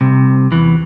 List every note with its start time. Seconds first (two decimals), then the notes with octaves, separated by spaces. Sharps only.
0.01 C2 C3
0.51 E2 E3